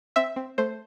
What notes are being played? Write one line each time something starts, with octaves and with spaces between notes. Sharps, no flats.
C4 E5
C4
A3 C5